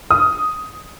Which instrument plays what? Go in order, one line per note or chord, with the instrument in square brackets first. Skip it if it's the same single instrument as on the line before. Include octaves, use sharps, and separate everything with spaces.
[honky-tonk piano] D#6